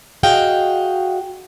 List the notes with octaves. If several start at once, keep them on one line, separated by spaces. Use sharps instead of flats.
F#4 G#4 D#5 F5 G5